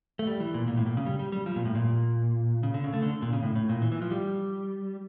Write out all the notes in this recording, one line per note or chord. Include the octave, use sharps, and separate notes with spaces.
A3
G3
E3
A#2
A#2
A2
A#2
C#3
G3
G3
G3
F3
A#2
A2
A#2
C#3
D3
C#3
A3
D3
A#2
C#3
A2
A2
A#2
E3
E3
F3
G3